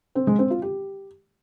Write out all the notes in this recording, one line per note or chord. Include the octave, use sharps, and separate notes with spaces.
C4
G#3
C4
F4
G4